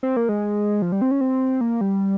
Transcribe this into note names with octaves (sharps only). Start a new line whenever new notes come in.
C4
A#3
G#3
F3
G3
C4
C#4
C4
A#3
G3